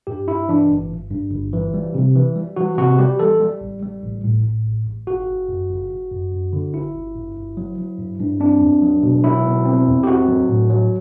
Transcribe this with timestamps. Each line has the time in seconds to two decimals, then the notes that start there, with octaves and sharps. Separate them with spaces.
0.07 G2 G4
0.28 G2 E4
0.49 E3 D4
0.70 G1
0.91 G2
1.11 G2
1.32 G1
1.53 E3
1.74 G3
1.94 C3
2.16 E3
2.36 G3
2.56 E3 F#4
2.78 C3 F#4
2.98 G3 G4
3.19 E3 A4
3.40 G3
3.61 A1
3.82 G3
4.02 A1
4.24 A2
4.44 A2
4.66 A1
4.87 A1
5.07 G1 F#4
5.28 G1
5.49 F#2
5.70 G1
5.90 G1
6.11 F#2
6.32 F#2
6.53 D3
6.74 G1 E4
6.94 G1
7.16 G2
7.37 G1
7.57 F#3
7.78 F#3
7.99 G2
8.20 G2
8.40 C4 D4
8.61 E2
8.82 F#3
9.03 B2
9.24 F#3 E4
9.45 B2
9.65 C4
9.87 E2
10.03 G4
10.07 C4 F#4
10.28 F#3
10.49 A2
10.70 F#3